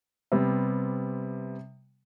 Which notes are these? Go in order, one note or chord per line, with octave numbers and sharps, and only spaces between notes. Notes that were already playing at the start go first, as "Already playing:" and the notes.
C3 G3 B3 C4